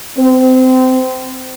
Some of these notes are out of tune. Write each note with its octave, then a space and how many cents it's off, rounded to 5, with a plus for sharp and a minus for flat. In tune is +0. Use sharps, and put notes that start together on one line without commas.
C4 -25